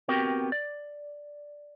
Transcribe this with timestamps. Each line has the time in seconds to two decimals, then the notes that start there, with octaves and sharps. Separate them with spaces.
0.08 B3 C4 F#4 G4 A#4 G5
0.52 D5